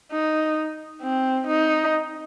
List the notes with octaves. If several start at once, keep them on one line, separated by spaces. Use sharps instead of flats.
D#4
C4
D#4